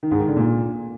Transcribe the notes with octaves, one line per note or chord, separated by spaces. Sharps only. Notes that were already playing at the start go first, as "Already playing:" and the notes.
D#3
G#2
D#3
D3
A#2